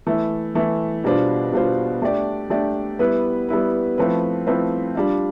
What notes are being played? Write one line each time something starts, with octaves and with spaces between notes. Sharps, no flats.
E3 A3 E4
E3 A3 E4
B2 G3 D4 F4 C5
B2 G3 D4 F4 C5
A3 D4 G4 D5
A3 D4 G4 D5
G3 B3 E4 B4
G3 B3 E4 B4
F3 A3 C4 E4 B4
F3 A3 C4 E4 B4
G3 D4 F4